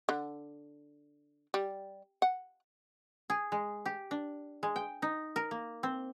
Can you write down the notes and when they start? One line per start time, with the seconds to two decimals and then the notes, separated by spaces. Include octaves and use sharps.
0.09 D3
1.54 G3
2.22 F#5
3.30 G#4
3.52 G#3
3.86 G4
4.11 D4
4.63 G#3
4.76 G5
5.02 D#4
5.36 A#4
5.51 A#3
5.83 C4